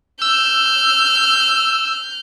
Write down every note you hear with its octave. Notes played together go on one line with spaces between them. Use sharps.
E6 F6 G6